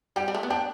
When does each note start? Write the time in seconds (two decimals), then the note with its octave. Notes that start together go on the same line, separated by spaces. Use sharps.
0.16 G3 G5
0.28 G3
0.35 A3
0.43 B3
0.50 D4 G5